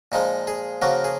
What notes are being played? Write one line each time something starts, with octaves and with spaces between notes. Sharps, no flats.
A#2 F3 G#3 D#4
G#4
C#3 F3 A#3 F#4
G#4